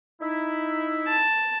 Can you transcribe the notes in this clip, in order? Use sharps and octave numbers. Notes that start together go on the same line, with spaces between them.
D#4 E4
A5